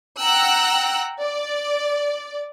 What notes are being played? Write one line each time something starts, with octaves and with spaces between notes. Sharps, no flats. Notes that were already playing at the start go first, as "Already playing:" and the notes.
F#5 G5 A#5 E6 F#6
D5